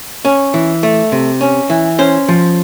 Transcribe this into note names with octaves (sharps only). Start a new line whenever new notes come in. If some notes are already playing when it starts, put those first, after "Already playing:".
C#4
E3
A3
C3
C#4
E3
C#4 C5
F3